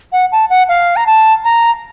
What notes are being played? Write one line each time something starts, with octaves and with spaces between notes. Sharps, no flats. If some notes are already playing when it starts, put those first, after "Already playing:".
F#5
A5
F#5
F5
A#5
A5
A#5